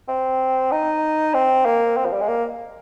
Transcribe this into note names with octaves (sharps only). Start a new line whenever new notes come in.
C4
D#4
C4
A#3
C4
F3
G3
G#3
A#3